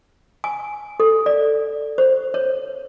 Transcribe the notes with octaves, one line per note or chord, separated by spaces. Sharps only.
G#5
A4
D5
C5
C#5